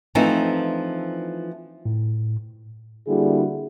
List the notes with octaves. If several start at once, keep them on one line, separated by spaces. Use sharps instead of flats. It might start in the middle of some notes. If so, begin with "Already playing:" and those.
E3 F3 A3 C4 D4 D#4
A2
D3 G3 A#3 E4 F#4 G#4